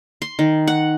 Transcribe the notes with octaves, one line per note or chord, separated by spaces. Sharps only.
C6
D#3
F#5